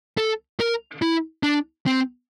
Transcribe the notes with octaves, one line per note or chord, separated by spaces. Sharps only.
A4
A#4
E4
D4
C4